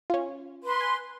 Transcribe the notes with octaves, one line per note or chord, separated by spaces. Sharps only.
C#4 F4
B4 C6
G#5